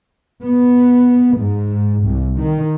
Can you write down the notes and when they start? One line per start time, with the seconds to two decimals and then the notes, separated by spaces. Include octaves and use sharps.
0.43 B3
1.38 G#2
2.05 C2
2.39 D#3